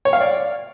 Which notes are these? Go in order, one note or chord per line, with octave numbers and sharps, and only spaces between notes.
C#5
F5
D5